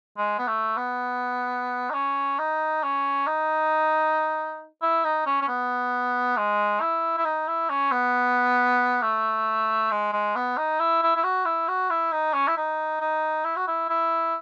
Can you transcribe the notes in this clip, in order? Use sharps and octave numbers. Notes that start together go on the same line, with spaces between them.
G#3
B3
A3
B3
D#4
C#4
D#4
C#4
D#4
E4
D#4
C#4
C#4
B3
G#3
E4
E4
D#4
E4
C#4
B3
A3
G#3
G#3
B3
D#4
E4
E4
E4
F#4
E4
F#4
E4
D#4
C#4
E4
D#4
D#4
E4
F#4
E4
E4